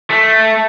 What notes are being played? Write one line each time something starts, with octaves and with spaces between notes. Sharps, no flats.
A3